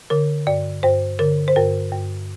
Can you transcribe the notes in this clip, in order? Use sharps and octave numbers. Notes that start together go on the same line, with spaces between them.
D3 A#4
G2 D5
G2 C5
D3 A#4
C5
G2 A#4
G2